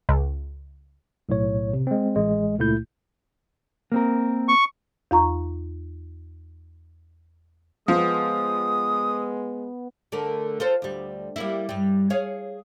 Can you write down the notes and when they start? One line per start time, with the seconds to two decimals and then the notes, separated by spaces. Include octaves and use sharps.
0.09 C#2
1.29 B1 A2 C#5
1.73 C3
1.87 G#3 C4
2.16 A1 G#3
2.59 C#2 A#2 A3 E4 G6
3.92 A#3 C4 A#4
4.49 C#6
5.11 E2 F4 A#5 C#6
7.88 F3 G#3 B3 D#6
10.12 D3 A3 A#4
10.60 F4 A4 C5
10.82 D2 G3
11.36 G3 A#3 E4
11.69 G2 G3
12.10 G#4 C#5 F5